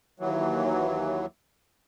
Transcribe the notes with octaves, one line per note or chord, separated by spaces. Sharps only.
D#2 E3 F#3